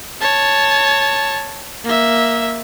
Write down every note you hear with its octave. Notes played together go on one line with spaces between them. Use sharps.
C#5 A5
A#3 E5